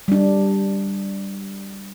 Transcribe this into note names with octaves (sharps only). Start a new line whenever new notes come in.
G3 D4